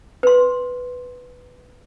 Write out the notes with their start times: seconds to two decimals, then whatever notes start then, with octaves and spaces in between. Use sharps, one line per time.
0.23 B4 C6